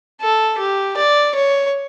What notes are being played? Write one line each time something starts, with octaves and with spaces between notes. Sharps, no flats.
A4
G4
D5
C#5